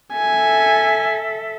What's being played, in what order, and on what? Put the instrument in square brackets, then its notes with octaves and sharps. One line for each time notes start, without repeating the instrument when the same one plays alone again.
[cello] A4 E5 [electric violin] G#5